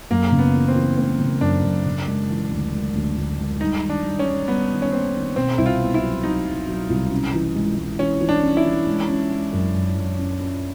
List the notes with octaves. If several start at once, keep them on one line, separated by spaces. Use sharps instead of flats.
F#2 A#3
C#3
B3
E3
C4
E3
A3 C4
C#3
F#2 D4
F#2
C#3
G#3
E3
D2
G#3
D2
D2
G#3
G3 D#4
D#3
D4
G3
C#4
G3
G3 B3
D#3
C#4
A#3 C4
D#3
B2 C4
C2 E4
F4
B3
E4
F#3
F#3 D#4
F#3
F#3
C2
C#4
E3
G#3
G#3
E3 C#4
E3
D4
C#4
E4
E3
G#3
C#4
G#3
F#2
F#2
F#2
C#4
C#4